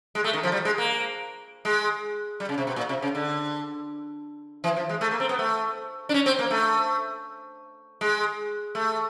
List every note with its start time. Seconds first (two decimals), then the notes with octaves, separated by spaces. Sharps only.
0.15 G#3
0.24 A3
0.33 D#3
0.43 F3
0.52 G3
0.65 G#3
0.78 A#3
1.65 G#3
2.40 G3
2.49 C#3
2.58 C3
2.67 B2
2.76 A#2
2.89 C3
3.02 C#3
3.15 D3
4.64 E3
4.77 F3
4.89 G#3
5.01 A3
5.11 A#3
5.20 C4
5.29 B3
5.39 A3
6.09 D4
6.14 C#4
6.26 C4
6.39 A#3
6.51 A3
8.01 G#3
8.75 A3